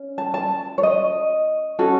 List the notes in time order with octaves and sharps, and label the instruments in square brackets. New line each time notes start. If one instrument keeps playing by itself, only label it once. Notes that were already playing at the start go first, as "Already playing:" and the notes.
Already playing: [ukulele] C#4
A5
A5
C#5
D#5
C#4 F#4 A4